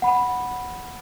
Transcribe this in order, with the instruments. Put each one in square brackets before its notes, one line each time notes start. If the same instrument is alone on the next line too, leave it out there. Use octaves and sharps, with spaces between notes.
[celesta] F#5 B5